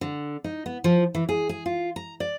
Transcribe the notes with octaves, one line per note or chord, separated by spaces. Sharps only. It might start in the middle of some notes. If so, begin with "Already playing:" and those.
D3
D#4
B3
F3
E3
G#4
G#4
F4
A#5
D5